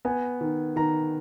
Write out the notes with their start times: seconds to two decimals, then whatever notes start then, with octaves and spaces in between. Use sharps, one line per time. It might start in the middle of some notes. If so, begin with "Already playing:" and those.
0.05 B3 G#5
0.41 D#3
0.76 D#3 A#5